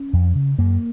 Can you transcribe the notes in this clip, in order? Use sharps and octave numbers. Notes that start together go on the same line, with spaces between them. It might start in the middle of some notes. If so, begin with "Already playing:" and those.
Already playing: C#4
F2
C#3
F#2 A#3